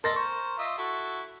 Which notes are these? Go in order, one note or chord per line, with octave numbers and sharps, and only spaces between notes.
D4 A4 A#4 D#5 C6 A6 A#6
A#4 C5 C#6
F4 D#5 E5
E4 F#4 A4